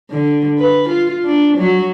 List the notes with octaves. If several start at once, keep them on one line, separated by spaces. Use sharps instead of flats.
D3
B4
F4
D4
F#3